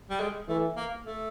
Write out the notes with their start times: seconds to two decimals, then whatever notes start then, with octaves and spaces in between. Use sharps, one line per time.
0.10 G3
0.20 G#3
0.48 E3 A3
0.76 A#3
1.04 A3